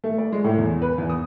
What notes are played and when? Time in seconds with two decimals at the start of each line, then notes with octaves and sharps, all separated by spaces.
0.04 A3
0.18 D5
0.32 G#3
0.44 A2
0.58 E2
0.82 B4
0.98 E2
1.09 D#6